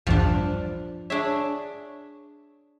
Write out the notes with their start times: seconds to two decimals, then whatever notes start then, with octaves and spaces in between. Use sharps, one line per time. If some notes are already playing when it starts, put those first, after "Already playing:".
0.07 A#1 E2 G2 F3 D4
1.10 D4 G#4 C#5 E5